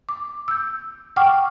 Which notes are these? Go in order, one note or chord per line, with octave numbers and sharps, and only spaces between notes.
D6
E6 G6
F#5 G5 C#6 D6 F6